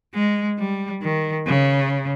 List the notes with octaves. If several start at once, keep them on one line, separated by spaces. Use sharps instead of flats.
G#3
G3
D#3
C#3